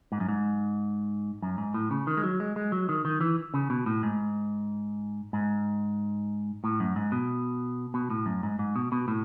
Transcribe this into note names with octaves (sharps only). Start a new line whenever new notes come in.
G#2
F#2
G#2
F#2
G#2
A2
C#3
D#3
G#3
F#3
G#3
G#3
F#3
D#3
D#3
E3
C#3
B2
A2
G#2
G#2
A2
F#2
G#2
B2
B2
A2
F#2
G#2
G#2
B2
B2
A2